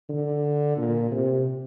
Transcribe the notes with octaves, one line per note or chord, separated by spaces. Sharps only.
D3
A#2
C3